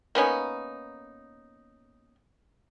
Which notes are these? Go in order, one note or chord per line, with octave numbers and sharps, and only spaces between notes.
A#3 B3 C#4 D#4